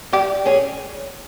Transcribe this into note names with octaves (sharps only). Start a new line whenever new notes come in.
G3 G4
C#4 G#4 C#5